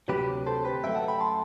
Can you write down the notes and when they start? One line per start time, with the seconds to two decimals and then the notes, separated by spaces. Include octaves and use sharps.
0.08 D2 C3 F#3 G4 B4
0.46 A4 C5
0.65 G4 B4
0.83 F#2 F#3 A3 E5 G5
0.95 F#5 A5
1.08 G5 B5
1.20 A5 C6